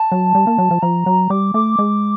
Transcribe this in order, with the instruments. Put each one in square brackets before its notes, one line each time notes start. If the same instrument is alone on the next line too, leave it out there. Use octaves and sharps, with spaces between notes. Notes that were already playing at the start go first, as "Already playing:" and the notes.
Already playing: [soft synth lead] A5
[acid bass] F#3
G3
A#3
F#3
F3
[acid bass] F3 [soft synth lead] A#5
[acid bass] F#3
[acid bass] G3 [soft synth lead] D6
[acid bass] A3 [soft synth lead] D6
[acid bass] G#3